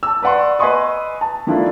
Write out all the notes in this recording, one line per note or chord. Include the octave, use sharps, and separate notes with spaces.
A5 E6
B4 D5 F#5 C6 C#6
B4 D#5 G#5 C6 C#6 D#6
A5
D#3 F3 A3 D4 E4 F4